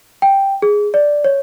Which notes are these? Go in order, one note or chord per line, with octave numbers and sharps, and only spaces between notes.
G5
G#4
D5
C#5